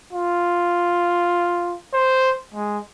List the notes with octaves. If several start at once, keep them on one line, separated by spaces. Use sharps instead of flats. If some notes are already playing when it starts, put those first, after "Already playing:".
F4
C5
G#3